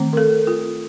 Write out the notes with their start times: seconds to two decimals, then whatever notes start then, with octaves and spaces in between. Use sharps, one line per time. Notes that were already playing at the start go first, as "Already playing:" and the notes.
Already playing: D#3 A3 C4
0.13 A#4
0.17 A4
0.47 F4